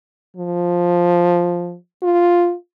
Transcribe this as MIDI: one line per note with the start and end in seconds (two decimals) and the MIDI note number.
0.37 1.75 53
2.03 2.54 65